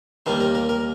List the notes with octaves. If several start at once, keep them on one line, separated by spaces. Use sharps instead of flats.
D#2 D#3 G3 A#3 C5
A#4
A#4
A#4